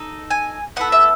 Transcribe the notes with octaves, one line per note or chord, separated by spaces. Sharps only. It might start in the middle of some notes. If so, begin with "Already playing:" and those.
Already playing: D#4 A4
G#5
B3 E4 A4 F#5
E5